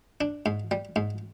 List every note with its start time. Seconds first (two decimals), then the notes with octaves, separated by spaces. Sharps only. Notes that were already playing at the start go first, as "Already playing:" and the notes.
0.21 D4
0.46 G#2
0.71 G3
0.96 G#2